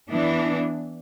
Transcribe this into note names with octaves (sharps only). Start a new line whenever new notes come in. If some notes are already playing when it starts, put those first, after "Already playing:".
E3 B3 D4